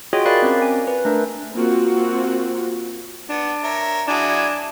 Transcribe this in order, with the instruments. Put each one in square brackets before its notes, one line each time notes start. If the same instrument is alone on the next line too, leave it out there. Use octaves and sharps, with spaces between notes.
[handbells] F4 F#4 G#4 C#5 D#5 G5
A#4 D5 F5 B5 F#6 A6
C4 C#4 A#4
G#5
B4
A3 D4 A#4
[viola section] A#3 C4 F4 F#4
[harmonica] B3 [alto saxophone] D4
[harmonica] A#4 C#5 E5
[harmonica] F#3 E4 G#4 [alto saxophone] D4